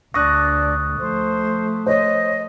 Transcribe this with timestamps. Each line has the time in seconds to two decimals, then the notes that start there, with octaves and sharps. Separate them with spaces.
0.14 D2 D4 C#6 D#6 F#6 A#6
0.99 F3 A3 C5
1.86 C5 C#5 D#5